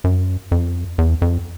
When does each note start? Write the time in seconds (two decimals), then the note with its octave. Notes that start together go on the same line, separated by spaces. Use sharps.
0.04 F#2
0.51 F2
0.98 E2
1.22 F2